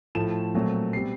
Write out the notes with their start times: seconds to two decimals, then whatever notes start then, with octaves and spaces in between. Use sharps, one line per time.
0.15 A2 F3 A3 E7
0.55 A#2 F#3 A3 C4
0.93 B2 G3 C4 C7